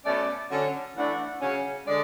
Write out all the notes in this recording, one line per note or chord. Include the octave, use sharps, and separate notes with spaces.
B2 A3 C#4 D5
D3 F#3 C#4
E3 A3 D4 F#5
C#3 F#3 C#4
D3 G#3 D4 D5